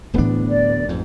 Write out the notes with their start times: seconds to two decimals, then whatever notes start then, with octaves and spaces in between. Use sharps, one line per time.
0.14 D1 A2 E3 B3 D4
0.49 D5
0.89 A1 F2 G#2